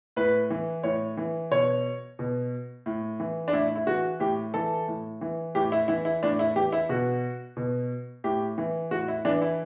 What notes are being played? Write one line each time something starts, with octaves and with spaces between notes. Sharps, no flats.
A2 B4
E3
A2 C#5
E3
B2 C#5
B2
A2
E3
D4
A2 E4
E4
E3 F#4
A2 G4
E3 A4
A2
E3
A2 G4
E4
E3 E4
E4
A2 D4
E4
E3 G4
E4
B2 F#4
B2
A2 G4
E3
A2 F#4
E4
E3 D4
E4